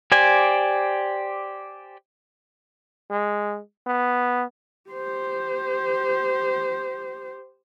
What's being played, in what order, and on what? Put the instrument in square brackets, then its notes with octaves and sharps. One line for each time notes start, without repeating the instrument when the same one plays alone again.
[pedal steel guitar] G4 C5 D5 G#5
[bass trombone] G#3
B3
[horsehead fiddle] G4 C5